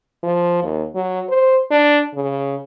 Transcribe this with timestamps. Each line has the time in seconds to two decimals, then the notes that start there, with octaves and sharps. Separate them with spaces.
0.23 F3
0.63 D#2
0.95 F#3
1.28 C5
1.71 D4
2.14 C#3